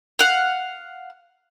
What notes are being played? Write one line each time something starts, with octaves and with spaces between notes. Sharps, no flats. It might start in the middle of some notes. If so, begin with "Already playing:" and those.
F5 F#5